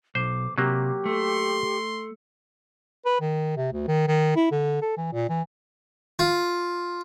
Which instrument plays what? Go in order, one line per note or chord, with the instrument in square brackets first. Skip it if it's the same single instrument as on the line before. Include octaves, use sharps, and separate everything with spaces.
[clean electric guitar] B1 [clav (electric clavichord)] C5 [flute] D6
[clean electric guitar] C3 [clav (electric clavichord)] F#3 A#3 [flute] G4
[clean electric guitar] A3 [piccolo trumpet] C6
[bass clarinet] B4
D#3
C3
D2
D#3
D#3
E4
D3
A4
E3
A#2
E3
[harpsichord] F4